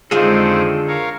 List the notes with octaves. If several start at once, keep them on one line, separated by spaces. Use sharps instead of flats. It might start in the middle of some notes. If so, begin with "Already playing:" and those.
F2 D3 D#3 G#3 C4 F4 G#4 A4
A#4 C#5 F5